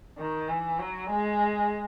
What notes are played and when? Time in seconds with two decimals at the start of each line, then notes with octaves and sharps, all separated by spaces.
0.18 D#3
0.49 E3
0.80 F#3
1.10 G#3